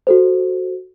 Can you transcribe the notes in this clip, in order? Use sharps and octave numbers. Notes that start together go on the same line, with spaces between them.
F#4 A4 C5